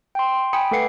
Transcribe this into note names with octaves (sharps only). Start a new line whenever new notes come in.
G5 C6
G5 G#5 B5 D#6 C#7
A3 A4 B4 F#5 C7 C#7